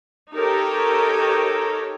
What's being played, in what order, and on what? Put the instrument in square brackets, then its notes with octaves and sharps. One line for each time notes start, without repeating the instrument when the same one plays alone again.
[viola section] D#4 G4 A4 A#4 C#5